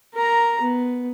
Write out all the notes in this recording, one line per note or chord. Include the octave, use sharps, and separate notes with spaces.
A#4 A#5
B3